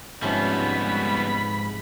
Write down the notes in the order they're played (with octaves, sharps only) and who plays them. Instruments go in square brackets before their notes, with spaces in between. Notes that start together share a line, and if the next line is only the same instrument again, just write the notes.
[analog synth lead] G#2 [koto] C3 F3 C#4 [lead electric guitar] G3 B3 [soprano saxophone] B5